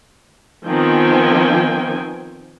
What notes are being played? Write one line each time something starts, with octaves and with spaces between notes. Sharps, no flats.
D#3 F3 B3 C4 G5 G#5